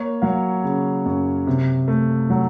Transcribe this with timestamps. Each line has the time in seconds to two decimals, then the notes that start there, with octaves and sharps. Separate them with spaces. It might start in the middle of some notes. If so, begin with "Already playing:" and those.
Already playing: A#3 C#5
0.22 F#3 F5
0.64 C#3
1.06 F#2
1.47 C3
1.88 A3
2.30 F#3